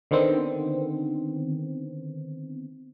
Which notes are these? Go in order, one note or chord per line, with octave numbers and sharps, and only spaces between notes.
D3 D#3 B3 C4